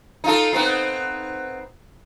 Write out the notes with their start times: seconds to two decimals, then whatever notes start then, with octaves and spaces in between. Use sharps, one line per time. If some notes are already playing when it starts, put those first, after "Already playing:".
0.24 D#4 F4 A4
0.53 B3 C4 D#4